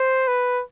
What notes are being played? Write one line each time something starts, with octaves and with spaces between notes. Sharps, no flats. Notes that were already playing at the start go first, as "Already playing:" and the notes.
Already playing: C5
B4